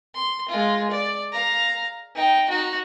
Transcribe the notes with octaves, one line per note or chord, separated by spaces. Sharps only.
C6
G#3 F4
D5
F5 A#5
D#4 G5
D#4 F#4